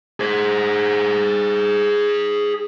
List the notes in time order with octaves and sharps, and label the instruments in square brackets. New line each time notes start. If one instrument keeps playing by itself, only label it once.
[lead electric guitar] G#4 C5